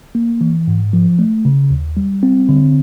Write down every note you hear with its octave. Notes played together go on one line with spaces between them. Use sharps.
A#3
E3
G#2
F3
A3
C#3
D#2
G3
C4
D3